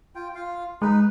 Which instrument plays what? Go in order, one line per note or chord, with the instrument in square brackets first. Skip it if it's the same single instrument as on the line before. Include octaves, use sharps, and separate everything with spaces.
[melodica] F4 G5
F4 F5
[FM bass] G#3 [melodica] D#4 B4